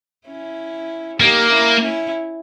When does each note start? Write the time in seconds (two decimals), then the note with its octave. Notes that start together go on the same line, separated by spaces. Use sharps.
0.28 C#4 E4
1.20 A#3 D#4 G4
1.51 C#4 E4
1.81 C#4 E4